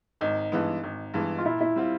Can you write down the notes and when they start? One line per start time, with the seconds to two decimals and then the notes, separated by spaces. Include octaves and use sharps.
0.21 G#1 D#4
0.52 G2 E3 G#3 B3
0.84 G#1
1.14 G2 E3 G#3 B3
1.38 F4
1.45 A#2 E4
1.61 E4
1.76 G3 C4 F4